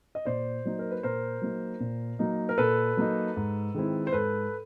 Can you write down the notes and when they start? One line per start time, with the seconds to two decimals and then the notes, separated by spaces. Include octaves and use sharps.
0.15 D#5
0.25 A#2 C5 D5
0.65 F#3 A#3 D#4
0.79 A#4
0.91 B4
1.03 A#2 A#4 C5
1.42 F#3 A#3 D#4
1.80 A#2
2.19 F#3 A#3 D#4
2.49 A#4
2.58 A#2 A4 B4
2.97 F#3 A#3 D#4
3.36 G#2
3.74 D#3 G#3 C4 E4
4.07 C5
4.12 G#2 A4 B4